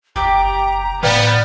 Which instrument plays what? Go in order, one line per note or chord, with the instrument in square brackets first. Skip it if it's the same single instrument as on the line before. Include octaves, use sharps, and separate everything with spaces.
[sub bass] F#1 [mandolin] G4 D5 D6 [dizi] A#5
[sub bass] A2 [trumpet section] B3 [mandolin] B4 F5 G5 [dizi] D5